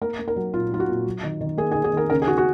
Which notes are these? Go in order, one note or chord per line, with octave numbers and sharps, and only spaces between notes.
A#3 A#4
A#3
A#4
F#3
A#2 F4
F#3 F4
F#4
A#2
F#3
D#3
D#3
A#3 G#4
G#4
D#3
G#4
D#3 A#4
C#3 A#4
G#4
C#3 F#4
F#4